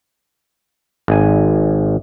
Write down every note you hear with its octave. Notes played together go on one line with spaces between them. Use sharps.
G#1 G#5